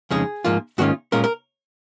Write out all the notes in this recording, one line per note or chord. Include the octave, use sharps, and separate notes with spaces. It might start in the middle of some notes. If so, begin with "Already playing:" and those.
F2 C#3 G#3 D#4 G#4
G#2 F3 A#3 F4
G#2 D#3 A#3 C#4 F4 F#4
A#2 G#3 C#4 F4 A#4
A#4